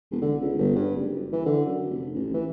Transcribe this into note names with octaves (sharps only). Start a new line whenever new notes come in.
E1
D3
C#2
G1
G2
F#1
E3
D3
F#2
F1
A1
E3